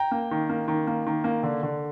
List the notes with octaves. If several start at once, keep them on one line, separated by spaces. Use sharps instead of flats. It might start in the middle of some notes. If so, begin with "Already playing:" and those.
Already playing: G5 A#5
A#3
D#3
A#3
D#3
A#3
D#3
A#3
D3
D3